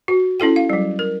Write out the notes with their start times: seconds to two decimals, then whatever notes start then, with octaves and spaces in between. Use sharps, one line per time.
0.08 F#4
0.40 C#4 E4 A4 G5
0.56 F5
0.70 F#3 G3
0.99 A#4